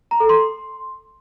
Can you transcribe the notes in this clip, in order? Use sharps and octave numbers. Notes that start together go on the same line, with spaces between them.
A#5
A4
C6